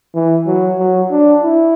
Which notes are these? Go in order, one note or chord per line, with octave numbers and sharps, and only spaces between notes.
E3
F#3
F#3
D4
E4